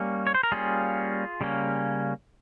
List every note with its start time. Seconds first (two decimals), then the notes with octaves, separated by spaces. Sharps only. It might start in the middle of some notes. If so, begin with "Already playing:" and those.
Already playing: G3 A#3 C#4
0.27 C#5
0.35 C5
0.43 A#4
0.52 G3 A#3 C#4 F4 G#4
1.41 C#3 G3 A#3 C#4